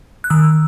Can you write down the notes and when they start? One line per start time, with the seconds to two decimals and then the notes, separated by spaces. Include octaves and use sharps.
0.24 F#6
0.30 D#3 E6